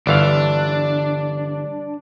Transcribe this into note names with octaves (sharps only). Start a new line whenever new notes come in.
G1 E3 D4 F5